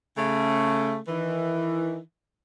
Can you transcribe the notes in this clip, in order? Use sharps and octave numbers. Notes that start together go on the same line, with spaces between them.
C#3 A3
D#3 E3